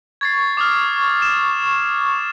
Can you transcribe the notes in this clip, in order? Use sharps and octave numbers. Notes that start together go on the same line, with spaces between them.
C#6 G#6 A6 C7
D6 D#6 F6
E7